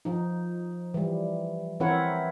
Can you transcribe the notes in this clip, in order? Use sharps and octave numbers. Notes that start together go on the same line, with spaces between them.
F3 D#4
E3 G3
E3 C4 E4 A#4 C#5 F#5